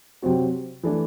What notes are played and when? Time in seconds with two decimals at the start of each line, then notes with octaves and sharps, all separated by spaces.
0.22 C3 F#3 C4 F#4
0.83 E3 A3 D4